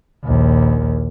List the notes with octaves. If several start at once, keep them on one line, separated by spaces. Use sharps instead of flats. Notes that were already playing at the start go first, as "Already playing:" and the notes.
A#1 D#2